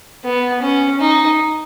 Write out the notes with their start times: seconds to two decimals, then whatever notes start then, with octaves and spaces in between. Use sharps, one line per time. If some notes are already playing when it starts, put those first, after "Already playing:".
0.25 B3
0.62 C#4
1.00 D#4